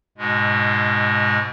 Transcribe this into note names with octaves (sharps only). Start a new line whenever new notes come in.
G#2 B2 G#3